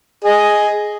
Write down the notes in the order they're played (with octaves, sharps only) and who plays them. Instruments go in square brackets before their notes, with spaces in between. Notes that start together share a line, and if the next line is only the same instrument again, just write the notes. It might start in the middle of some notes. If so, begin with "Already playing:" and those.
[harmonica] G#4 D#5